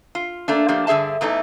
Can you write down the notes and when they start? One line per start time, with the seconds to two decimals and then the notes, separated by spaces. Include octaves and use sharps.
0.15 F4
0.48 A3 A#3 D4
0.68 F3 A3 A#3 D4 G4
0.87 G2 D3 G#4 E5 A5
1.21 E2 E3 A3 D#4